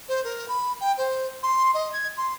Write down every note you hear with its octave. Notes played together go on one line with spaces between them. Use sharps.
C5
A#4
B5
G5
C5
C6
D#5
G#6
C6